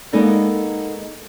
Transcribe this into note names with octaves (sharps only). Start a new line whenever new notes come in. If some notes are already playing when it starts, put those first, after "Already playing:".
G#3 A#3 B3 D#4 A4 D5